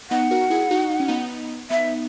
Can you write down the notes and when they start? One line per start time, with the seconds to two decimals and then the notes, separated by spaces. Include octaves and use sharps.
0.10 B3 D#4 F#5
0.31 F#4 A#4
0.50 E4 G#4
0.71 D#4 F#4
0.90 D#4
1.00 C#4
1.08 B3 D#4
1.70 B3 D#4 E5